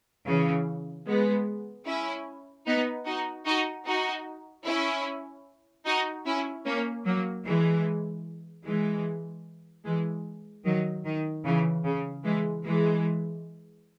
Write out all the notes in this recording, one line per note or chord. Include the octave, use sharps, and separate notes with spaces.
C#3 E3
G#3 B3
C#4 E4
B3 D#4
D#4 F#4
D#4 F#4
D#4 F#4
C#4 E4
D#4 F#4
C#4 E4
A#3 C#4
F#3 A#3
E3 G#3
E3 G#3
E3 G#3
D#3 F#3
D#3
C#3 E3
C#3
E3 G#3
E3 G#3